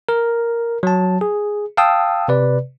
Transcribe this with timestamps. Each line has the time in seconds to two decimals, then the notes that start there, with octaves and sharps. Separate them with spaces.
0.09 A#4
0.83 F#3 A5
1.21 G#4
1.77 F5 G5 A5 D#6 E6
2.28 C3 B4 D5